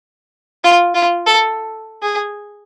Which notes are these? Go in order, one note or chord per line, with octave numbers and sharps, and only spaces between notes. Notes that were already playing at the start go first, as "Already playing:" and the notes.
F4
F4
A4
G#4